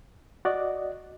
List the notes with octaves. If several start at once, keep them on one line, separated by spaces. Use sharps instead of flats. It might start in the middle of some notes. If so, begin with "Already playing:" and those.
F#4 D5 D#5